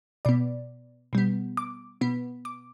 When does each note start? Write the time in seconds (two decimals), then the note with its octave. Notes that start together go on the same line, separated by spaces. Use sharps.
0.25 B2 B3 D5
1.13 B2 G3 B3
1.57 D6
2.01 B2 B3
2.45 D6